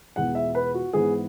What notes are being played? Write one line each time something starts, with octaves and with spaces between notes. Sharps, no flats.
E2 B2 G#3 B3 F#5
E5
B4
F#4
G#2 E3 B3 G#4